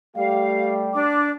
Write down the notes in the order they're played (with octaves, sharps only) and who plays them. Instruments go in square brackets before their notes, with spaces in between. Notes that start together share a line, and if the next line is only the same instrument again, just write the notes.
[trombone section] G3 A3 G4 [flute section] F5
[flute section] D4 D6